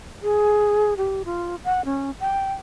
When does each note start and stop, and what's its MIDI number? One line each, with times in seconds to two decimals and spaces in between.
0.23 0.94 68
0.97 1.23 67
1.25 1.56 65
1.64 1.84 78
1.85 2.11 61
2.20 2.53 79